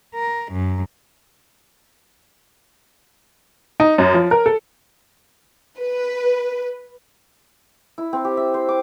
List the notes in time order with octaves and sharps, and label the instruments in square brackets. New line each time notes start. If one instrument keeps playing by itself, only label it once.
[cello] A#4
F#2
[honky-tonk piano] D#4
F#2
F3
A#4
A4
[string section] B4
[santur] E4
C4
G4
E5
C5
D6